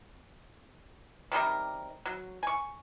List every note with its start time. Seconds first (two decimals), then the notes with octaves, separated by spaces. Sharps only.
1.32 C3 D#3 G3 A#4
2.05 F#3
2.43 G#5 C#6